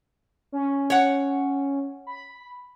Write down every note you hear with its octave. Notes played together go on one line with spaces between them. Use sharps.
C#4
C#5 F#5
B5